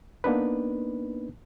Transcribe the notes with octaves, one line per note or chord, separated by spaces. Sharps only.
A#3 B3 D4 D#4 B4